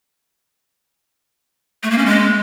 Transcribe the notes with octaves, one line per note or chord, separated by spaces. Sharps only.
A3
A#3
C#4
G#3